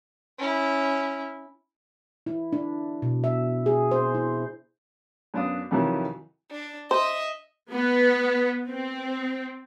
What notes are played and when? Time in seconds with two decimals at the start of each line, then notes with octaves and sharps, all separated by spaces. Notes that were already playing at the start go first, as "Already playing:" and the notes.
0.39 C#4 E4
2.26 E4
2.53 D4
3.02 B2
3.24 E5
3.66 G#4
3.91 C5
4.15 E4
5.34 F#2 B3 D4 F5 D#6
5.71 F2 C3 D#3 E3 F#3
6.51 D4
6.91 C5 D#5 E5
7.72 B3
8.68 C4